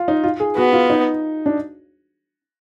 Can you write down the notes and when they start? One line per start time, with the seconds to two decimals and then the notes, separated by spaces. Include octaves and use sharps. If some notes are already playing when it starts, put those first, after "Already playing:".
Already playing: F4
0.08 D#4
0.24 F4
0.40 G#4
0.56 B3 F#4
0.73 F4
0.90 D#4
1.46 D4